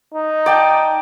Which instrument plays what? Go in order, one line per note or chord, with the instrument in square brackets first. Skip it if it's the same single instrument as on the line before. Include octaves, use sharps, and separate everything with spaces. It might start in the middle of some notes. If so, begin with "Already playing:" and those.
[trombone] D#4
[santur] D5 G5 A5